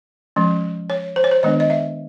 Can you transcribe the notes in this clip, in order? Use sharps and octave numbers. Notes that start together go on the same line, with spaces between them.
F3 G#3 C#4
C#5
C5
C#5
C5
D#3 G#3 B3 D4 D#5
D#5
E5